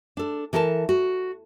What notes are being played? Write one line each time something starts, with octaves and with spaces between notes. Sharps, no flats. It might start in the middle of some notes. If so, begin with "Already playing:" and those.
D4 A4
E3 A4 A#4 C#5 A5
F#4